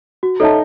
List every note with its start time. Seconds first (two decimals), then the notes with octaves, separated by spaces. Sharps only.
0.23 F#4
0.40 D#4 A4 C#5 E5 A5